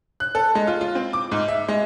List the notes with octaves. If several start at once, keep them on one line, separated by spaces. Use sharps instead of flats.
F#6
A4
G#3
F4
F4
C4
D6
G#2
E5
G#3